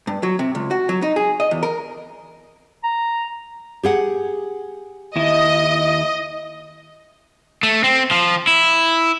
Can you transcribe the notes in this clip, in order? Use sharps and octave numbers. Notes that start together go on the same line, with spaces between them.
G2
F#3
C3
C#2
F#4
F#3
D#4
G#4
D#5
E2
A#4
A#5
G4 G#4 F#5
D#2 E4 D#5
A3
C4
F3
E4